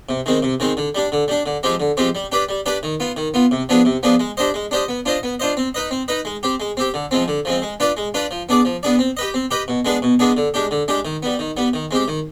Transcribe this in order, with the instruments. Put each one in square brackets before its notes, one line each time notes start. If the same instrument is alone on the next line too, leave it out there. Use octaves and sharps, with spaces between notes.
[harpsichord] C3
D#3 G#3 C4
C3
D#3 G#3 C4
D3
G3 D4
D3
G3 D4
D3
F3 G#3 C4 G4
D3
F3 G#3 C4 G4
G3
D4 G4 B4 D5
G3
D4 G4 B4 D5
D#3
B3 F4
D#3
B3 F4
C3
F3 B3 D4 G#4
C3
F3 B3 D4 G#4
G#3
D4 G4 C5 D#5
G#3
D4 G4 C5 D#5
B3
D4 F4 C5 D#5
B3
D4 F4 C5 D#5
C4
D#4 B4 D#5
C4
D#4 B4 D#5
G#3
C4 G4
G#3
C4 G4
D3
F3 G#3 C4
D3
F3 G#3 C4
G#3
D4 F4 B4 D5
G#3
D4 F4 B4 D5
F3
B3 D4 G#4 D5
F3
B3 D4 G#4 D5
C4
G4 B4 D#5
C4
G4 B4 D#5
B2
G#3 B3 D4 G#4
B2
G#3 B3 D4 G#4
D3
G#3 D4 G4
D3
G#3 D4 G4
D#3
G3 B3
D#3
G3 B3
D#3
G#3 C4 G4
D#3